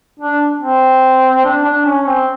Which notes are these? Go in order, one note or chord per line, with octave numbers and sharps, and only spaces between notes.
D4
C4
D4
D4
C#4
C4